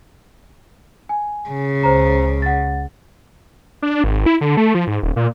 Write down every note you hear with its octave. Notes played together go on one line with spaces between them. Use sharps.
G#5
C#3
C#2 C5 A#5
F#5 A6
D4
G#1
E4
D3
A3
F3
G#2
D#1
A#2